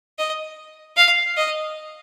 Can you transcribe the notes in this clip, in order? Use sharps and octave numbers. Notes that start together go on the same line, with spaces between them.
D#5
F5
D#5